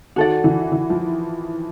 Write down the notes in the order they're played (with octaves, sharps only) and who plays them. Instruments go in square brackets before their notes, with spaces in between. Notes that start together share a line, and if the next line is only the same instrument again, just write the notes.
[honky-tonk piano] D#3 [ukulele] F#4 A4 D5
[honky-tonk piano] E3
E3
F3